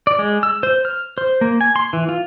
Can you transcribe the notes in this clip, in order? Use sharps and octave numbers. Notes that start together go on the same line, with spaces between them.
D5
G#3
E6
C5
F6
C5
A#3
G#5
C6
E3
F4